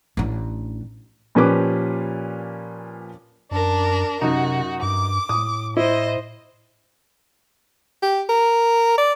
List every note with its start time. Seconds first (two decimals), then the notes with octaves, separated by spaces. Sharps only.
0.17 A1 D4
1.35 A#2 F3 C#4 G4 B4 D6
3.51 F#2 D4 A#4
4.22 F#2 C3 D#4 F#4
4.82 G2 D6
5.29 A2 D#6
5.77 E4 C5 D#5
8.02 G4
8.29 A#4
8.98 D5